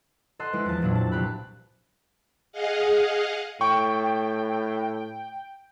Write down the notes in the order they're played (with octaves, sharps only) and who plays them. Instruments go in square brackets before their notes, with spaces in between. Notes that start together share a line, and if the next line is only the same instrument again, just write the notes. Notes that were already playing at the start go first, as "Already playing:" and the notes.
[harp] A4 D#5 F#5 C6 F#6
G#3 D4 E4 B4
E2 F3 A5
F2 A#2 F#3 D4 E4
A5
C2 A#2 G4 B5 F#6
[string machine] G#4 D#5 F5 F#5
[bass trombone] A2 [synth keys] G5 [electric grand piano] C#6